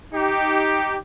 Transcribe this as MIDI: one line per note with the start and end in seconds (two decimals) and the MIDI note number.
0.13 0.95 63
0.13 0.95 67